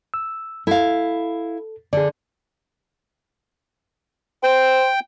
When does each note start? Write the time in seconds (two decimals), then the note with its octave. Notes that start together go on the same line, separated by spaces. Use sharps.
0.14 E6
0.67 E4 A4 F5
1.93 D3 G#4 D5
4.43 C5 G5